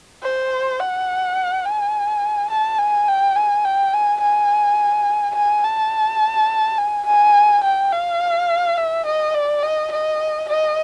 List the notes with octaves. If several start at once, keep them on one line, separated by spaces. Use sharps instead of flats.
C5
F#5
G#5
A5
G#5
G5
G#5
G5
G#5
G#5
G#5
A5
G#5
G#5
G5
F5
E5
D#5
D5
D#5
D#5
D#5